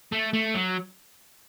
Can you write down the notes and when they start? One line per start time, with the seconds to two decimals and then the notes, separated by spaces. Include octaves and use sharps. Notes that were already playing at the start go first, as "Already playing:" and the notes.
0.12 A3
0.33 A3
0.54 F#3